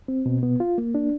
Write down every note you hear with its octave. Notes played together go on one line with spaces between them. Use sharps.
C4
B2
B3
F4
A#3
D4